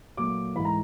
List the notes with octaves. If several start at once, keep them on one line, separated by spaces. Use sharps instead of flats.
A#2 F#3 A3 D6
G#2 E3 A3 B5
A#5